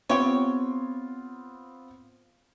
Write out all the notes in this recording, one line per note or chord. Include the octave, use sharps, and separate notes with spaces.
B3 C4 F4 G4 C#5